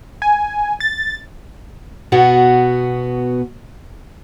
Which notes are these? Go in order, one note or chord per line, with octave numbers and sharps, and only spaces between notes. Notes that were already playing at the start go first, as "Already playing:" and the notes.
G#5
A6
B2 B3 F#4